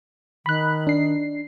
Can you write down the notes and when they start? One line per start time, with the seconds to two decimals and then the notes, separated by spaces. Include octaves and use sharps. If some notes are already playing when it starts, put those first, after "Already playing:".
0.46 D#3 B5 F#6
0.87 D4 C7